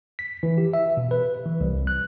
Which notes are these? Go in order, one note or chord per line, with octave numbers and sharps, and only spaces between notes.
B6
E3
G4
E5
B2
B4
E3
C2
F#6